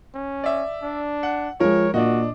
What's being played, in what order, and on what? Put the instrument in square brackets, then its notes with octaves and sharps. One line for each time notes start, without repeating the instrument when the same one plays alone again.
[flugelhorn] C#4
[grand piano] D5 E5
[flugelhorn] D4
[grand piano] F#5
[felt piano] F3 G#3 [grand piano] A#4 [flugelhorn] C#5
[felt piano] A#2 [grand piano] D4 D#5 [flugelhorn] F#4